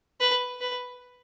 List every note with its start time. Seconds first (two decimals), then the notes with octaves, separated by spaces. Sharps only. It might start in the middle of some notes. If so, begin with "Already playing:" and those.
0.20 B4
0.61 B4